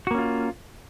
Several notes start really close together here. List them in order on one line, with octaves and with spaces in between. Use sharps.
F#4 A#3 C#4 F4